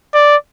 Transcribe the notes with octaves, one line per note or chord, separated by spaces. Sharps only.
D5